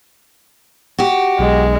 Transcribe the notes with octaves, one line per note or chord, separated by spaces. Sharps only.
F#4 G4
B1 G#3